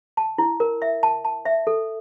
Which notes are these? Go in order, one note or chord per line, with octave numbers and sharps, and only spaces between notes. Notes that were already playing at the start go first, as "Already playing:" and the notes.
A5
E4
A#4
E5
A5
A5
E5
A4